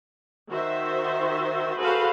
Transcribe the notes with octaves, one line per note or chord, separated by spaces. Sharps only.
D#3 F#4 C5 E5
F#4 G#4 A4 B4 C5 F5